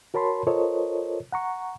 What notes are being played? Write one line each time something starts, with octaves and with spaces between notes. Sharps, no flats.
F#4 A#4 C#5 A5 B5 C6
F4 A4 A#4 C5 C#5 D#5
F#5 A#5 C#6